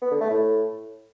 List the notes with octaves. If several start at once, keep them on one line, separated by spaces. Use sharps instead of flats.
B3
D3
A3
A2